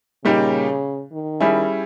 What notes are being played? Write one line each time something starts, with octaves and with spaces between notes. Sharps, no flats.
A#2 C#3 G3 A#3 D#4 G4
D#3
G3 C#4 E4 G#4